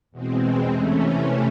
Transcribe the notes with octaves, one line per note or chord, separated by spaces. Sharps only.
E2 B2 G#3 C4
C3 E3 A3 C#4